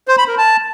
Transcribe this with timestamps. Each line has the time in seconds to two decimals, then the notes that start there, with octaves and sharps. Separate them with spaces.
0.08 C5
0.18 B5
0.28 A#4
0.38 A5